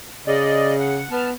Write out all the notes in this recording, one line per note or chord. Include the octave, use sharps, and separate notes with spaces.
C#3 D5 D#5
F#5
B3 A5 F6